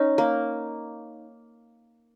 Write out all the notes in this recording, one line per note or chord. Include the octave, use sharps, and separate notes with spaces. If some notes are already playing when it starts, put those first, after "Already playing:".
Already playing: C#4 D#4
A#3